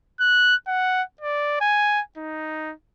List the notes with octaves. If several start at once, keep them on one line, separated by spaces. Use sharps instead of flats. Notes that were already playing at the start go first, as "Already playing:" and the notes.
F#6
F#5
D5
G#5
D#4